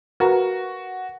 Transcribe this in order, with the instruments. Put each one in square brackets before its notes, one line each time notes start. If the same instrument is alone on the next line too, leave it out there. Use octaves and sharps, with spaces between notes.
[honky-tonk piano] F#4 [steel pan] A#4 B4 A#5